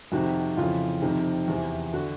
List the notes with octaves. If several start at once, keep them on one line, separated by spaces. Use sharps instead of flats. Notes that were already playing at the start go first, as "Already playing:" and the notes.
F2 C3 D#3 F#4
F2 C#3 E3 F4
F2 C3 D#3
E2 C3 E3
D3 F#4